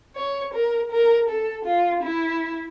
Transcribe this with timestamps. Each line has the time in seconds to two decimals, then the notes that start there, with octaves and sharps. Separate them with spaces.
0.16 C#5
0.54 A#4
0.91 A#4
1.29 A4
1.65 F4
2.03 E4